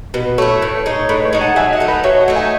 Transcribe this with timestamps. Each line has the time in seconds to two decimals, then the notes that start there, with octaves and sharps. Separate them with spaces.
0.14 B2 B4
0.38 A3 E4 C#5
0.61 A2 B4
0.77 C#5
0.86 G#3 D#4
0.94 C#5
1.09 A2 B4
1.25 C#5
1.33 G#3 D#4
1.41 F#5 A5
1.56 F#3 E5 G#5
1.73 D#5 F#5
1.80 A3 D#4
1.88 B4 D#5
2.04 F#3 C#5 E5
2.20 D#5 F#5
2.28 A3 D#4
2.35 E5 G#5